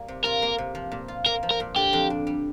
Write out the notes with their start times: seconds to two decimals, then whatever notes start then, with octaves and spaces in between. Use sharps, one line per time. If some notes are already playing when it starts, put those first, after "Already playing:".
Already playing: G3 A#3
0.08 C3
0.24 F4 A#4
0.42 A#3
0.58 C3
0.75 F3
0.92 A#2
1.08 F4
1.26 A#3 A#4
1.43 F3
1.51 A#4
1.60 A#2
1.76 D3 G4
1.93 F2
2.10 D4
2.27 G3